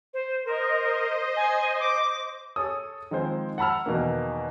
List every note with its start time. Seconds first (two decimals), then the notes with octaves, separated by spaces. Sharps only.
0.14 C5
0.45 A#4 C5 D#5
1.37 G#5
1.80 D6
2.56 G#4 A4 C#5 D#6
3.11 D#3 F3 G#3 C4 C5
3.58 F#5 A5 B5 E6 F6
3.86 E2 B2 D#3 A#3